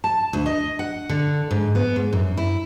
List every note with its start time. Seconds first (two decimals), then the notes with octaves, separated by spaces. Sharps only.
0.04 A5
0.33 D2
0.46 D#5
0.79 F#5
1.09 D3
1.51 G#2
1.75 B3
1.96 G#2
2.13 F#2
2.37 E4